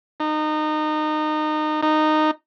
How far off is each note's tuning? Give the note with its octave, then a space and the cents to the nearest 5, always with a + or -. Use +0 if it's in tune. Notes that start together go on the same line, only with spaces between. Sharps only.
D#4 -25
D#4 -15